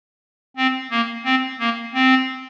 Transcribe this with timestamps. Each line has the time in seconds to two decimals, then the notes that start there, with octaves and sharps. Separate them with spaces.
0.57 C4
0.91 A#3
1.25 C4
1.59 A#3
1.94 C4